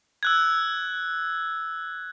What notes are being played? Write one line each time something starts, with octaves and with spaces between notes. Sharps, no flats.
E6 F#6 G#6